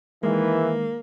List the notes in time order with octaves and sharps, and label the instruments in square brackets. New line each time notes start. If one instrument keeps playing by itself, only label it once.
[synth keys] D#3 G#3 [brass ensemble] E3 [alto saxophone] A#3